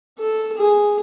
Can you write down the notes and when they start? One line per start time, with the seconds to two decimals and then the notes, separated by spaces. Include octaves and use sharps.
0.19 A4
0.57 G#4